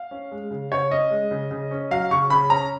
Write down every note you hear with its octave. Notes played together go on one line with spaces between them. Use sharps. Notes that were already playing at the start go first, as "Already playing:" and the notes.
Already playing: F5
C#4
G#3
C#3
C#3 C#5
C#4 D#5
G#3
C#3
C#3
C#4
F#3 F5
C#3 C#6
C#3 B5
C#4 A#5